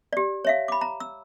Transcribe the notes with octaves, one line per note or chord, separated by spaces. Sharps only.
G4 D5
C#5 E5 F5
B5 D6
A#5
E6